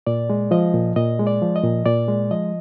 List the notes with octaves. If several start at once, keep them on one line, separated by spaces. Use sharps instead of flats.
A#2 D5
G#3
F3 D#5
A#2
A#2 D#5
G#3
D5
F3
D#5
A#2
A#2 D5
G#3
F3 D#5